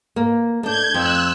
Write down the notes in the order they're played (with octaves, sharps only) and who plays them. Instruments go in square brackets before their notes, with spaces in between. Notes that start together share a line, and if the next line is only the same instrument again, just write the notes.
[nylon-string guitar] A#3
[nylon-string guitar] A3 D4 [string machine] G6 G#6
[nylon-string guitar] F2 [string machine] E6 F#6